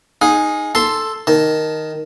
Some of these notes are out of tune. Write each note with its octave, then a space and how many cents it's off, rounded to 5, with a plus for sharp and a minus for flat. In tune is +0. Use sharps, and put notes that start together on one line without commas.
D#4 +0 G#4 +0 F5 +40
A4 +0 A5 +15 C6 +5
D#3 +0 A5 +0